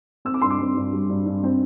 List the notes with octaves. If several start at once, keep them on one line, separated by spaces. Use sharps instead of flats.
C4 E6
D6
G2 C6
D6
C4
G2
G3
G2
G2
C4